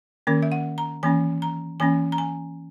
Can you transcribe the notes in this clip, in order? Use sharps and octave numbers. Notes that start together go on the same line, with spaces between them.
D#3 A#3 C#4 A#4
E5
F#5
A#5
E3 A#3 C#4 G#5
A#5
E3 A#3 C#4 G#5
A#5
G#5